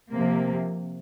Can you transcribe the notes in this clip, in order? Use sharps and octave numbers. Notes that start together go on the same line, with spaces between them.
C3 F3 A#3